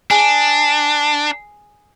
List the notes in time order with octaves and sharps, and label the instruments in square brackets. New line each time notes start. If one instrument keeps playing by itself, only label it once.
[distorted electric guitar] D4 [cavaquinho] G#4